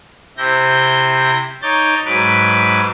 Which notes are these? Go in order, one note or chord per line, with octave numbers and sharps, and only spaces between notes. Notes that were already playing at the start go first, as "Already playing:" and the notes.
C3 E4 G6 A#6
D#4 C#5 D6 G6 A6
G#2 F#3 B4 D6